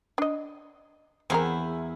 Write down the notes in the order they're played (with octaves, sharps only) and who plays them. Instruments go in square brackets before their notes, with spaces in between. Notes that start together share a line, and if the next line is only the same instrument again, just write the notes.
[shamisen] D4 D#5
[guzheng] E2 E4 [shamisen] C4 G#4 A#4